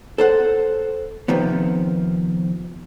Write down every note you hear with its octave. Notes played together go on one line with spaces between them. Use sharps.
A4 C5 F#5
C3 D#3 F3 B3